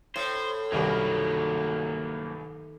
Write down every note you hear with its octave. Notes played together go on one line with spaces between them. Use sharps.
A2 C5
G1 C2 D#3 F#3 G3 A#3